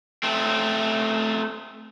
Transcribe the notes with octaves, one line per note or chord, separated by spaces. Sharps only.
A3 C4